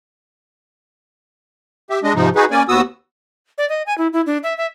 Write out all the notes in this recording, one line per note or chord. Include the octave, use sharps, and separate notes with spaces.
G4 E5
G#3 D4 D#5
G#2 C3 F3 D#4
D#4 F#4 G#4 B4
A#3 C#4 D5 G#5
D#2 B3 F#4 D#6 E6
D5
D#5
G#5
E4
E4
D4
E5
E5